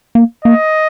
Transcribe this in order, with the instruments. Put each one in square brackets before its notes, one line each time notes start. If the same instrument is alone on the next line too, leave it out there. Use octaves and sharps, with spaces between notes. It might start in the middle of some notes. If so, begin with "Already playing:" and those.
[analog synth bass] A#3
[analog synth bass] A#3 [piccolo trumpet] D#5